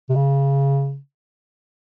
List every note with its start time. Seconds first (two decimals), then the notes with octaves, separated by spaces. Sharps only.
0.09 C3
0.15 C#3